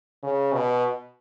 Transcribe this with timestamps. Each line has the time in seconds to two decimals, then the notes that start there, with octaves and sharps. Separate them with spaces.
0.23 C#3
0.53 B2